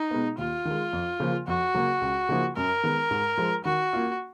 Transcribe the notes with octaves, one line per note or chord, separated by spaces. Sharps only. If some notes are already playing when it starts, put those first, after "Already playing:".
Already playing: D#4
B2 G#3 B3
D#2 F4
D#3
G#3
F2
C#3 F3 A#3
F2 F#4
C#3 F#3 A#3
C#2
C#3 F3 A#3 D#4
F#2 A#4
D#3 G#3 B3
G#2
F3 G#3
D#3 F#4
A#3 F4